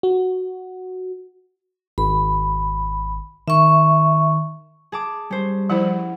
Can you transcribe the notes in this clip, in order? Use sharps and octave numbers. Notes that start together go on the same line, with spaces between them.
F#4
G#1 B5
D#3 E5 C#6
G#4 A5 D6
G3 C#4 C5
F3 E4 C5 F#5